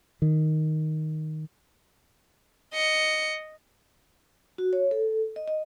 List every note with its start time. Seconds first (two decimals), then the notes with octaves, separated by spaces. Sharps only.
0.22 D#3
2.74 D#5 C#7
4.58 F#4
4.73 C#5
4.91 A4
5.36 D#5
5.48 D#5